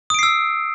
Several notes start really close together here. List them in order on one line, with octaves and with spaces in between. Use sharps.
D#6 D7 C7 E6